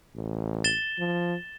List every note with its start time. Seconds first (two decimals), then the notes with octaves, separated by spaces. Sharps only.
0.16 A1
0.64 A6 E7 G7
0.99 F3